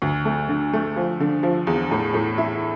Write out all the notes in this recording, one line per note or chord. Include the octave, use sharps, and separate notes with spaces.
D2
A3
D3
A3
F3
D3
F3
E2
A2
A2
E4